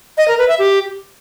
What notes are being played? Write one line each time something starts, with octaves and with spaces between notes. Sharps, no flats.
D#5
A#4
B4
E5
G4